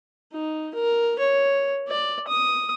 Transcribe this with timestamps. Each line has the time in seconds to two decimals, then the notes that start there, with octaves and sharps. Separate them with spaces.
0.33 D#4
0.74 A#4
1.19 C#5
1.88 D5
2.28 D#6